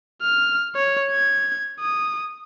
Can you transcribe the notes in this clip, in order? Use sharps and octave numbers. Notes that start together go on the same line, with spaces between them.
F6
C#5
G#6
D#6